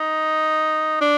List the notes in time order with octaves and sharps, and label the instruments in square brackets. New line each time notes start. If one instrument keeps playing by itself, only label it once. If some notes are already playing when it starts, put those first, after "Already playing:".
Already playing: [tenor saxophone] D#4
D4